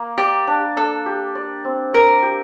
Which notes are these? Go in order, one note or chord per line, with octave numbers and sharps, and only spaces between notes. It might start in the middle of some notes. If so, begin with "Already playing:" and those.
Already playing: A#3
G4 D5
D4
D4 A4
G4
D5
C4
A#4 D5
G4